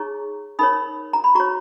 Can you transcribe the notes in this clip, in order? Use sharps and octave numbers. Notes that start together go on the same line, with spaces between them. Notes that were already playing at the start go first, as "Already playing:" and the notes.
Already playing: D#4 G#4 C#5 A#5 C#6
D#4 A#4 C#5 B5 D#6
A#5
B5
F#4 C#5 A#5 C#6